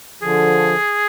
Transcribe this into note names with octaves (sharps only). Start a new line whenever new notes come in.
D3 F3 G#4